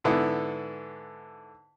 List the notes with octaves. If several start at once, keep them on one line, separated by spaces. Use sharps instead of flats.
G#2 D3 B3 E4